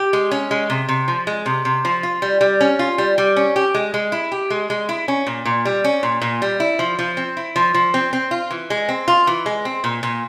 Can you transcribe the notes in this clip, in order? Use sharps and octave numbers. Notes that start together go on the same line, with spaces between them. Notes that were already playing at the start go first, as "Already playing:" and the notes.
Already playing: G4
G#3
C#4
G#3
C3
C3
F3
G#3
C3
C3
F3
F4
G3
G3
C#4
F4
G3
G3
C#4
G4
G#3
G#3
E4
G4
G#3
G#3
E4
C#4
A#2
A#2
G3
C#4
A#2
A#2
G3
E4
F3
F3
C4
E4
F3
F3
C4
C4
F4
E3
G#3
C4
F4
E3
G#3
C4
A#2
A#2